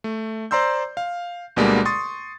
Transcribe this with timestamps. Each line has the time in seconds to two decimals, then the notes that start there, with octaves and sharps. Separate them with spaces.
0.04 A3
0.51 C5 D5 A#5 C6 E6 G6
0.97 F5
1.56 D2 B2 D3 G3 G#3 A#3
1.85 C6 C#6 D#6 A6